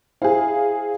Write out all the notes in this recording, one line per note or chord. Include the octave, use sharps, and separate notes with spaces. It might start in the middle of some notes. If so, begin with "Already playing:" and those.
E4 G#4 C5 F5